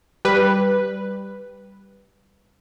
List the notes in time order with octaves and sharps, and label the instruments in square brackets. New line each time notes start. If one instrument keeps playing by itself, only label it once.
[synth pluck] G3 B4